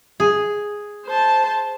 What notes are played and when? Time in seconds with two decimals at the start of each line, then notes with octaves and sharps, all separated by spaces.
0.20 G#4
1.06 C5 A5